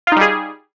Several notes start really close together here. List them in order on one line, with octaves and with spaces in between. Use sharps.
F4 D#4 G3 G#4